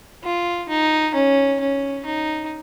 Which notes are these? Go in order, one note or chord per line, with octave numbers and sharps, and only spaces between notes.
F4
D#4
C#4
C#4
D#4